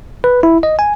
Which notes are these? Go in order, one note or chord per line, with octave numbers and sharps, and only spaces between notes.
B4
E4
D#5
G#5